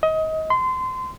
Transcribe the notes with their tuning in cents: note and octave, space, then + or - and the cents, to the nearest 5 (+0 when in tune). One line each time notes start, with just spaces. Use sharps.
D#5 +25
C6 -25